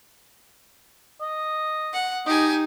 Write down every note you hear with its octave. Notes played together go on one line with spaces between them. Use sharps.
D#5
F#5
D#4 G4 D#5 G#5